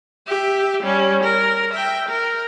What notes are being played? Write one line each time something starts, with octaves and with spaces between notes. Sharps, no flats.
G4 E5
G3 C#4
A#4
E5 G5
A#4